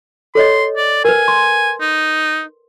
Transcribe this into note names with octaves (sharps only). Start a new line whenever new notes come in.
A4 C#5 D#5 C6
D5
A#4 B4 G#5
C6
D#4